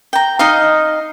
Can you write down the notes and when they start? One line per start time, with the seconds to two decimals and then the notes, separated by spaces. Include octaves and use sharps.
0.13 G5 A#5
0.39 D#4 D#5 F5